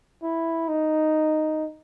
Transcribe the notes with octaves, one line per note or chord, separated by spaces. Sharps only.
E4
D#4